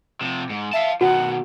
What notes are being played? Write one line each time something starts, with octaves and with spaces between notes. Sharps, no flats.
C3 F3
G#2
E5 F5 A5
B2 D#3 F#4 F#5